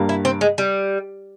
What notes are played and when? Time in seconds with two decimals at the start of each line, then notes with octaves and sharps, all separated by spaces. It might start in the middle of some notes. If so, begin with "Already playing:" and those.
Already playing: G2 G3 A#3
0.09 E4
0.25 C4
0.41 G#3
0.58 G3